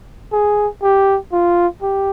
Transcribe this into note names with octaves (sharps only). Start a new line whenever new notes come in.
G#4
G4
F4
G4